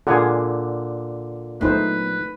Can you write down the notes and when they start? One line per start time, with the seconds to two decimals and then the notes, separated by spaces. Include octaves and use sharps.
0.07 A#2 D3 G#4 F#5 G#5
1.61 F#3 A3 B3 D#4 B4 C5